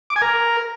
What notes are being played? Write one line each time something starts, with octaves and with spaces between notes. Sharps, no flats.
D6
G#5
A#4